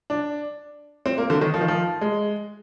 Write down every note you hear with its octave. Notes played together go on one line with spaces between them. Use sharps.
D4
C4
A#3
D3
D#3
F3
D#3
F3
G#3